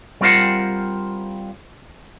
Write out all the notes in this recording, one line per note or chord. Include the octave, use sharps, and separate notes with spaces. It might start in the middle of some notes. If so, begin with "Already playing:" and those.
G3 C4 F4 A#4 C5 F#5